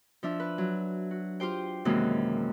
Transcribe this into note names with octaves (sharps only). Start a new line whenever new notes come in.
F3 D4 E5
B4
F#3
F#4
F4 G4 C5 G5
F#2 C3 D#3 E3 G#3 A#3